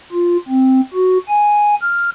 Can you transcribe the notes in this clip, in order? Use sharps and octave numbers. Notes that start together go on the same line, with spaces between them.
F4
C4
F#4
G#5
F6